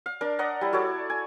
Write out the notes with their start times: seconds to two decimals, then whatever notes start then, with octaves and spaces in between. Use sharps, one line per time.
0.06 F5
0.21 D4 A#4
0.39 D5 D#5 F#5 A#5
0.61 G3 E4
0.73 F#4 A4 C#5 D5
1.10 G#5